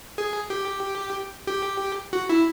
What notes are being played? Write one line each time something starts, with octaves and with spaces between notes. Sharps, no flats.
G#4
G4
G4
F#4
E4